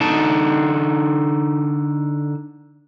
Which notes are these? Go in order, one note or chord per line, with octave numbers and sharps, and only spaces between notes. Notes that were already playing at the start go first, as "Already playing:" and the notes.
D3 D#4 A5